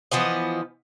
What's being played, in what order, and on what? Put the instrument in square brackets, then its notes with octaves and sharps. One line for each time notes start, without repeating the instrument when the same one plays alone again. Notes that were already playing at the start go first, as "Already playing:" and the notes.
[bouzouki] E3 F3 B3 D#5